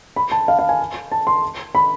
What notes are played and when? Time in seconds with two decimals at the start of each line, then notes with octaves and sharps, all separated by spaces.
0.16 B5
0.31 A5
0.48 F5
0.59 F5
0.69 G#5
1.12 A5
1.27 C6
1.75 B5